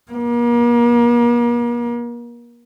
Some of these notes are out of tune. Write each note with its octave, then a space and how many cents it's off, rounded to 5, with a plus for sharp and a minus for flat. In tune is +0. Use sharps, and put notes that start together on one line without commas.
A#3 +40